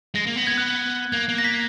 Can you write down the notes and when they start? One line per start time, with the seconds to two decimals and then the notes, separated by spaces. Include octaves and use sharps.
0.15 G#3 A#6
0.26 A#3
0.36 B3
0.47 G#6
0.58 F#6
0.69 G#6
1.12 A#3 G#6
1.29 A#3
1.38 A#6
1.44 B6